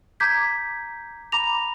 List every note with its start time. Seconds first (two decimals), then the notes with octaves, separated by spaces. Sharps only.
0.20 A#5 D6 G6 G#6 B6
1.32 A#5 B5 D6 A#6 F7